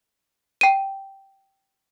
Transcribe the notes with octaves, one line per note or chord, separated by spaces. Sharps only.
G5 D#7